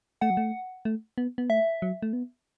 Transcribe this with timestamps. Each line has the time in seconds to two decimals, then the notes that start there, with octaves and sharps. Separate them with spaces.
0.21 A3 F#5
0.30 F#3
0.37 A3
0.85 A3
1.18 B3
1.38 B3
1.50 A3 E5
1.82 F#3
2.02 A3
2.13 B3